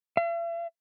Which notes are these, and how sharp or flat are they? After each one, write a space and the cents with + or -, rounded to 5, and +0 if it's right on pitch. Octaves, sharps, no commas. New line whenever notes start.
E5 +45